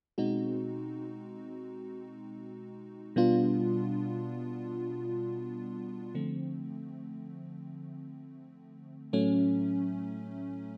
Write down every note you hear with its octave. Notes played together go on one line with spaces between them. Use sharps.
B2 G#3 C4 D#4 F#4
B2 G3 B3 D4 F4
D3 F3 A3 C4
A2 F#3 A3 C#4